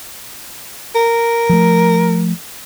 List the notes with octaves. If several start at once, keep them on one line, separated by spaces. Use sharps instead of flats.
A#4
F3 A3